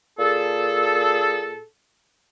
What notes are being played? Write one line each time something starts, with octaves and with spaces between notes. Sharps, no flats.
A#2 G#4 A4